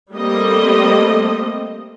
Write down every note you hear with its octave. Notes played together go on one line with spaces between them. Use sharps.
G3 A3 A#3 C4 D#5